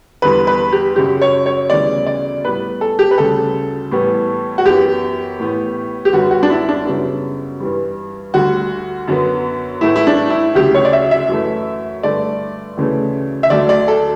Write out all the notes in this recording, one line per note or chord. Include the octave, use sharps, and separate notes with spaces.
E2 D3 G3 B3 B4
B4
G4
F#2 C#3 F#3 G4
C#5
C#5
D2 C#3 E3 G3 B3 D5
D5
A2 G3 B3 B4
A4
G4
B4
D2 C#3 G3 A4
A2 E3 G3 B3
F#4
F#2 E3 B3 G4
A2 E3 B3
G4
F#2 D3 G3 B3 F#4
F#4
D4
E4
D4
F#2 C#3 G3 B3
G2 E3 G3
D2 D3 G3 F#4
F#2 D3 F#3 B3
A2 E3 A3 E4
E4
D4
E4
D2 C#3 F#3 G4
C#5
D5
E5
E5
F#2 E3 A3
G2 D3 A3 D5
D2 C#3 E3 A3
E5
D2 D3 F#3 A3 D5
D5
A4